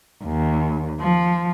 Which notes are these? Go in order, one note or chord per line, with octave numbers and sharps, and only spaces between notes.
D#2
F3